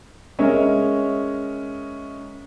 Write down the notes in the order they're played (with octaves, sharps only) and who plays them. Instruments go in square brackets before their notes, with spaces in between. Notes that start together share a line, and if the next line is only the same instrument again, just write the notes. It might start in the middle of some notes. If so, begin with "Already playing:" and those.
[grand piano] G#3 C#4 A#4 C#5 D#5 E5